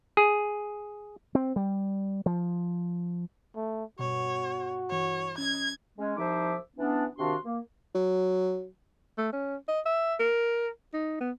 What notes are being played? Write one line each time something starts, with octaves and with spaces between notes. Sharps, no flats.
G#4
C4
G3
F3
A3
G2 B2 F#4 C#5
G2 E3 C#5
C#4 D#5 G#6
G#3 C#4
C2 F3 D#4 C5 E5 D6
E3 B3 C#4 D4
C3 D#3 D4 F#4 F5 C6
A#3
F#3
A3
C#4
D#5
E5
A#4
D#4
B3